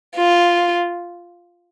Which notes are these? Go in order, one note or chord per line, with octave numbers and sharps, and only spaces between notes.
F4